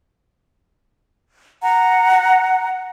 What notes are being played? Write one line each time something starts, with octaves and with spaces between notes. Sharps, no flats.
F#5 A#5